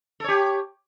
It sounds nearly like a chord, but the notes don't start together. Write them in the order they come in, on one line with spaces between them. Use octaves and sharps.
A4 C#5 G4